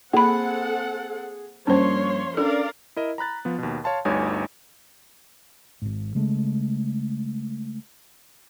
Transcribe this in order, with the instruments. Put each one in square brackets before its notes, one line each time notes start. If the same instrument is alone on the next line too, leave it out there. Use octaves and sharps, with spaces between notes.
[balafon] A#3 B5 [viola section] C4 A4 F#5 [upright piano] G#4
[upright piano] G2 A#3 [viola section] F3 C#5 C6 [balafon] C#4 C5
[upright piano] C#4 D4 [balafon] A4 [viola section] A#4 D5 F5
[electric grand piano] E4 A#4 D#5
A#5 B5 F#6 A6
F3 B3
D#2 B2
C#5 F5 A5 C6
G1 D2 G2 D#4 C#5 G#5
[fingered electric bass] G#1 G#2
C#3 G#3 A3